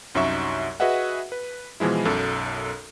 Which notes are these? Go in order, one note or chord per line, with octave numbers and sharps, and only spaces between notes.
C2 F#2 F#3 D#4 E5 C#6
F#4 G#4 B4 D#5 E5 F#5
B4
B2 E3 F3 G#3 E4
B1 F#2 A4